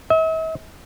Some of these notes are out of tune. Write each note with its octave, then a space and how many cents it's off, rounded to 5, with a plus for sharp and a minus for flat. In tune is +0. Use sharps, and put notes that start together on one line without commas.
E5 -45